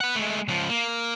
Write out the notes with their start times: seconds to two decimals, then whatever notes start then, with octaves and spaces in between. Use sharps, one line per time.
0.01 B4 F#5
0.15 G#3 A3
0.48 C#2 F3
0.69 A#3